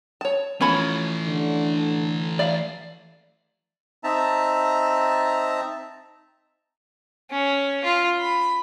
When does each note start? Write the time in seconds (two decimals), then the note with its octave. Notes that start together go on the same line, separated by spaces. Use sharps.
0.21 C#5 A5
0.61 E3 F3 A3 C#4 C#5 B5
1.26 D3
2.39 D5 E5 F5
4.04 C4 D#4 E5 A5 A#5
7.31 C#4
7.84 F4
8.19 B5